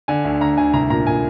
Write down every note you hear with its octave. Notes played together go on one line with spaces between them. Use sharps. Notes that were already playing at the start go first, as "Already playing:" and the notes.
D3 G#5
D2
D2 A#5
D2 G#5
C2 A#5
A#2 A#5
A#2 G#5